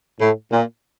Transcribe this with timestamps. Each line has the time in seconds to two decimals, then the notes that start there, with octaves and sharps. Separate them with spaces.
0.20 A2
0.51 A#2